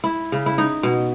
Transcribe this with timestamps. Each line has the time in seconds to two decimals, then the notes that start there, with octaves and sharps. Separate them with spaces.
0.04 E4
0.32 C#3
0.46 E4
0.58 D#4
0.83 B2